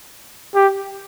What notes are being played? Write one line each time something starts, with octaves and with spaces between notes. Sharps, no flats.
G4